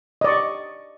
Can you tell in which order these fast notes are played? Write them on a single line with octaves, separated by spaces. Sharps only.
D#5 D5 C#6